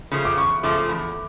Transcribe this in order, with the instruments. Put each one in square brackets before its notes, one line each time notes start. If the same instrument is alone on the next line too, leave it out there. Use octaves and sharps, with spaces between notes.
[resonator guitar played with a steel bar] C#3 F3 A3
[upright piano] D6
[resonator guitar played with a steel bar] E2 [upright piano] C#6
[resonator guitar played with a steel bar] C#3 F3 A3 [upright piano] D6
[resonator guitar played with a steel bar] E2